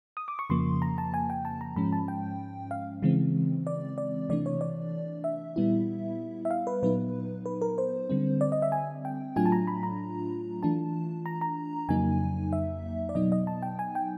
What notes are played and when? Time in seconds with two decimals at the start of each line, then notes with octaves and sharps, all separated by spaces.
0.17 D#6
0.28 D6
0.39 C#6
0.50 F2 C#3 F3 A#3 C6
0.82 A#5
0.98 A5
1.14 G#5
1.30 G5
1.45 A5
1.61 A#5
1.76 G#2 F3 G#3 C#4 B5
1.93 A5
2.08 G5
2.71 F5
3.03 C#3 E3 G#3 C4
3.67 D5
3.98 D5
4.29 C3 E3 A3 D4 D5
4.46 C#5
4.61 D5
5.24 E5
5.56 A#2 G3 B3 E4
6.45 E5
6.51 F5
6.67 B4
6.83 A#2 F#3 B3 D#4 B4
7.46 B4
7.62 A#4
7.78 C5
8.10 D3 G3 C4
8.41 D5
8.52 D#5
8.62 E5
8.72 G#5
9.05 G5
9.36 A2 F#3 A3 D4 F4 G#5
9.46 A5
9.52 A#5
9.67 B5
9.83 A#5
10.63 E3 A3 D4 F4 A5
11.26 A#5
11.41 A#5
11.89 F2 C#3 F#3 A#3 D#4 G#5
12.53 E5
13.09 D5
13.15 B2 F#3 B3 D#4 D#5
13.32 D#5
13.47 A5
13.62 G5
13.79 G#5
13.95 G5